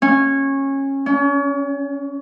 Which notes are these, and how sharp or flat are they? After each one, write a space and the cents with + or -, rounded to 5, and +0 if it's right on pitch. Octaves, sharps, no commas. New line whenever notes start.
C#4 -20
C#4 +35